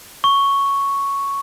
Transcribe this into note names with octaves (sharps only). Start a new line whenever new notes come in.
C#6